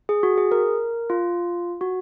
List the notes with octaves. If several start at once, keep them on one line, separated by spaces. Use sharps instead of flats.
G#4
F#4
G#4
A#4
F4
F#4